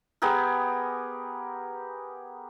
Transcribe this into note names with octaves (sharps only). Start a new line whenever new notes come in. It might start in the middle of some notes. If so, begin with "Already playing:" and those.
B3 G4 G#4 A#4